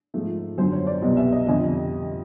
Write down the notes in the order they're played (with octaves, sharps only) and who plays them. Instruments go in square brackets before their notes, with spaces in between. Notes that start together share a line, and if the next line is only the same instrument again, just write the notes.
[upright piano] G#2 F3 A3
F#2 D3 F#3 C5
C#5
D5
C2 B2 F#3 B3 D#5
E5
D#5
F2 D3 G3 D#5